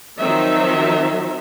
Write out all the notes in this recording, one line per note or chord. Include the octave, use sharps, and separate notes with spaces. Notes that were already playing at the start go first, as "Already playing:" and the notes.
D#3 F3 F#3 C4 D#4 E5